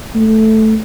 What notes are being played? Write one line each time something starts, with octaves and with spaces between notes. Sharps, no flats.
A3